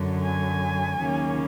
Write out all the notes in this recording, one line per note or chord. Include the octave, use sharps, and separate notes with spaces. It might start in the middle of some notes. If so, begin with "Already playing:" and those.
Already playing: F#2 D3 F#3
G#5
D#2 C#3 F#3 A#3 C#4